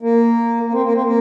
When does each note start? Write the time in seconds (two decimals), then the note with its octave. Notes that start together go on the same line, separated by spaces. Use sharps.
0.01 A#3
0.63 A#3
0.72 C4
0.83 A#3
0.92 C4
1.03 A#3